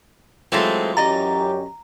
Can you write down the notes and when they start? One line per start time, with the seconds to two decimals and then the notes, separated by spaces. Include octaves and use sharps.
0.52 E3 F#3 G#3 A3 C4 F4
0.97 F#2 C#4 G4 D5 D#5 A#5